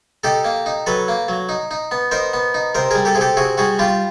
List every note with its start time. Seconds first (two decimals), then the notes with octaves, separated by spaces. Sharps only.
0.24 D#4 G4 A4
0.45 A#3
0.66 D#4
0.86 F#3 A4 B4
1.08 A#3
1.28 F#3
1.49 D#4
1.71 D#4
1.91 B3
2.11 D#4 A#4 C5
2.33 B3
2.54 D#4
2.75 C3 A#4 C5
2.91 G3 G#4 A#4
3.05 G4 A4
3.15 C3 G#4
3.21 G4 A4
3.37 C3 F#4 G#4
3.58 G3 F#4 G#4
3.79 G3 F4 G4